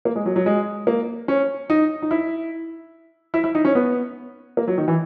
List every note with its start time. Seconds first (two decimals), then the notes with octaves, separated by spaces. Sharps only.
0.05 A#3
0.16 G#3
0.26 F#3
0.36 F#3
0.46 G#3
0.87 A#3
1.28 C#4
1.70 D#4
2.02 D#4
2.11 E4
3.34 E4
3.44 E4
3.55 D#4
3.65 C#4
3.75 B3
4.57 A#3
4.68 F#3
4.78 D#3
4.88 E3